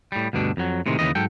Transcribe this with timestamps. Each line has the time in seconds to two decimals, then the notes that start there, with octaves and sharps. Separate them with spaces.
0.12 A2 G3
0.33 D2 G2 B2 D4
0.57 F2 F#3
0.86 A2 C3 D#3 G#3
0.99 D#2 C#3 E3 D#5
1.15 G#2 F#3 A4 G5